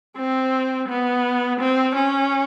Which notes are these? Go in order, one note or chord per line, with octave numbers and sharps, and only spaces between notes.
C4
B3
C4
C#4